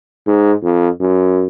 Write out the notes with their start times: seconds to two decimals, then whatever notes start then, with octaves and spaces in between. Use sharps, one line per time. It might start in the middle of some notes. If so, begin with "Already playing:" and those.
0.27 G#2
0.63 F2
1.00 F#2